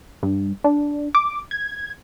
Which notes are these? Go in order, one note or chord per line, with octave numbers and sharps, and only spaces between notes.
G2
D4
D6
G#6